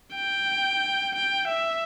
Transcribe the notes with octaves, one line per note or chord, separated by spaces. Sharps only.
G5
G5
E5